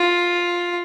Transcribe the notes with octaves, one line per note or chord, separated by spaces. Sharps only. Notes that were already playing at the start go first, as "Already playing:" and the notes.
Already playing: F4